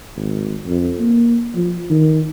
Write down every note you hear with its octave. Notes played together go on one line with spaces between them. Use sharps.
G#1
F2
A#3
F3
D#3